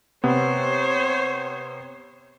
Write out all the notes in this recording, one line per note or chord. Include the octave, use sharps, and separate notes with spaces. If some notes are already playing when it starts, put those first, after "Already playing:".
C3 B3 C5 C#5